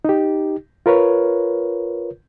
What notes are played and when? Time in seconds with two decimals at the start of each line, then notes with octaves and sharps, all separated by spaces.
0.05 D#4 G4
0.86 F4 A#4 B4 C#5